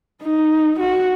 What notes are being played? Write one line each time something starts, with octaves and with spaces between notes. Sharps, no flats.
D#4
F#4